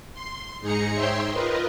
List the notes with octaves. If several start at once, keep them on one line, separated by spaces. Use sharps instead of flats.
C6
G#2 D#4 G#4 A#5 C#7
C5 C#5 E5 G5 C6
F4 A#4 B4 D#5